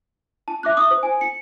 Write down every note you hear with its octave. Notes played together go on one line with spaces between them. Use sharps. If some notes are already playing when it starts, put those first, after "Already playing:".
A5
E5 D6 F#6
D#6
C5
G#5
C#7